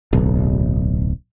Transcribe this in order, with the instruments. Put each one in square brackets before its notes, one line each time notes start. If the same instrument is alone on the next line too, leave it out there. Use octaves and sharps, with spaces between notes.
[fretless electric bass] D1 B1